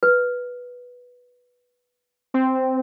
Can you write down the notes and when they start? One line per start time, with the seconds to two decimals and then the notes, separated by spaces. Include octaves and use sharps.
0.03 B4
2.34 C4